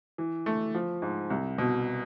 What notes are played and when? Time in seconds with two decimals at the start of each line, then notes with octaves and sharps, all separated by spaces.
0.18 E3
0.46 A3
0.74 F3
1.02 G#2
1.30 C2
1.58 B2